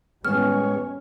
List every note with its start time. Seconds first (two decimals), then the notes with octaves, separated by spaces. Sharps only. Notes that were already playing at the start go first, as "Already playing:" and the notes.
0.25 A2 D#3 G3 G#3 B3 C#4 C#5 F6